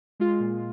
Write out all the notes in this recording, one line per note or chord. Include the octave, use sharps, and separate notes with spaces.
G#3 F4
A#2